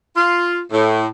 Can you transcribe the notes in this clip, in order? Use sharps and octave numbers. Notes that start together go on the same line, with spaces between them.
F4
A2